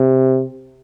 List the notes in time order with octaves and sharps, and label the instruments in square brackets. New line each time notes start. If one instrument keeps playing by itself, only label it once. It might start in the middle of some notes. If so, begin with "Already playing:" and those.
Already playing: [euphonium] C3